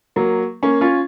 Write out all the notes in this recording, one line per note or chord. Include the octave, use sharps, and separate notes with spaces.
F#3 A#3
A#3 C#4
C#4 F4